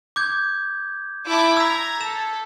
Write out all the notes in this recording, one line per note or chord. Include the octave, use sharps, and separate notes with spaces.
D6 G6 G#6
E4 A5 D6
A#5 E6 G#6 B6
A4 E7